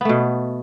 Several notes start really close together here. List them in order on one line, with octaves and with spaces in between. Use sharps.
B3 A3 B2